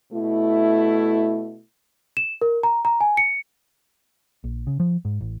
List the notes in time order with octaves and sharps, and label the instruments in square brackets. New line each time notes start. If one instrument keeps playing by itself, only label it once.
[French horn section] B2 A3 E4
[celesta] E7
A#4
A#5
A#5
G#5
C#7
[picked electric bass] A#1
C#3
F3
G#2
A1